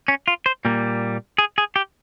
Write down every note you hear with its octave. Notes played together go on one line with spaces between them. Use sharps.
C#4
F4
C5
A#2 G3 A#3
G#4
G#4
G4